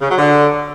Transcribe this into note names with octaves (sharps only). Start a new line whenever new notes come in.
C#3
F#3
D3